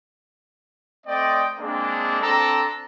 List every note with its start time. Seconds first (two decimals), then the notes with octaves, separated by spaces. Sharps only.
1.06 A3 C4 D5 D#5 G5
1.58 G#3 A#3 C4 D4
2.21 C4 D4 A4 A#5